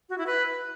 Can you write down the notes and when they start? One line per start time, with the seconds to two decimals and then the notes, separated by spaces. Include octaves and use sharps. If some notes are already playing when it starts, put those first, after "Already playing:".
0.09 F#4
0.18 E4
0.27 B4